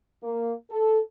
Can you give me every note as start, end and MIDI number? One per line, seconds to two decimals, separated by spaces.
0.22 0.53 58
0.70 1.00 69